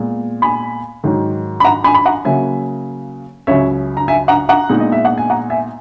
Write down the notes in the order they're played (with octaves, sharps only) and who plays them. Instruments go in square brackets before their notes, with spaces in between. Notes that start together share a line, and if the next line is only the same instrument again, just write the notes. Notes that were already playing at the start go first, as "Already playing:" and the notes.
Already playing: [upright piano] A#2 G#3 B3
G#5 B5
G#2 D#3 F#3
B5
F#5 A#5
G#5 B5
B5
F#5 A#5
C#3 F#3 A#3 E5 G#5
C#2 C#3 F#3 C#5 E5
A#5
E5 G#5
F#5 A#5
F#5 A#5
A#2 G#3 B3 D#4
D#5
E5
F#5
G#5
F#5 A#5
E5 G#5